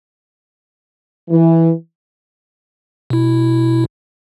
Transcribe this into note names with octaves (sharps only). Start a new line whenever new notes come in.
E3
B2 E4